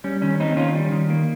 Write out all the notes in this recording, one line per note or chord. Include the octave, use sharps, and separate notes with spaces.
G3 C#4
D#3 C#4
A#3 C4 D#4
D#3 C#4 F4
G3
D#3
A#3